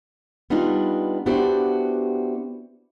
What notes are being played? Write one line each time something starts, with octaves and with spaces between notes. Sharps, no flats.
G3 B3 D4 D#4 F4
B3 D4 E4 F#4 G4 C5